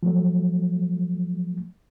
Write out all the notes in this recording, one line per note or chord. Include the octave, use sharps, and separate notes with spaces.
F3 F#3 A3